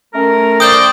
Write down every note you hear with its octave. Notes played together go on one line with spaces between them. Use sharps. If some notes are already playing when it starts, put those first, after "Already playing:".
A3 C#4 A#4
C5 D5 G5 D#6 G6